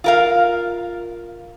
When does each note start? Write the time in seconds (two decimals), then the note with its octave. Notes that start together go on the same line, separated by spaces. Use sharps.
0.04 F4 A#4 F5